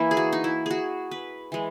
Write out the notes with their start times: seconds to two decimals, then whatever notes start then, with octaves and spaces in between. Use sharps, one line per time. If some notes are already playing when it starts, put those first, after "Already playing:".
Already playing: E3 A#3 E4
0.11 G#4
0.17 F#4
0.33 D#4
0.44 E4
0.66 F#4 G#4
1.11 B4
1.52 E3 G#3